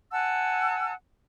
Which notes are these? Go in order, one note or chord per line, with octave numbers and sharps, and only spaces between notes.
F#5 G#5 A5 E6